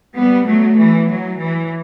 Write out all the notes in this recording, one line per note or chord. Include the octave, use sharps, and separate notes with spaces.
G3 B3
F#3 A3
E3
F#3
E3